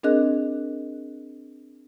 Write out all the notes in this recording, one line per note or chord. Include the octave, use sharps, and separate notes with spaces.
C4 D4 G#4 A#4 D#5 F#6